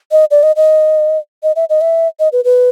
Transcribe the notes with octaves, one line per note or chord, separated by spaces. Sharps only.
D#5
D5
D#5
D#5
D#5
E5
D#5
E5
D#5
B4
B4